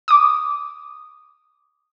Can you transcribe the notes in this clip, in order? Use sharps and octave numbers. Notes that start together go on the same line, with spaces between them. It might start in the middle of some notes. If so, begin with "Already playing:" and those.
D6 D#6